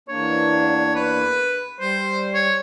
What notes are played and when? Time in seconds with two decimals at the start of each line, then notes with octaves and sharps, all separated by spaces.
0.09 E2 A#3 D4 C#5
0.95 B4
1.80 G3 C5
2.34 C#5